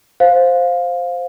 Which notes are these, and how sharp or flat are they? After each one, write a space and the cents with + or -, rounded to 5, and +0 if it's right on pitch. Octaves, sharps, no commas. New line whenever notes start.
C5 +0 F5 +10